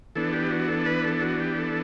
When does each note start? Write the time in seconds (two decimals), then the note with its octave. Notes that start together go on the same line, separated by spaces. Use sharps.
0.16 E3 B3 D4 A4
0.33 G4
0.51 F#4
0.68 A4
0.86 B4
1.05 A4
1.21 F#4
1.40 G4
1.58 A4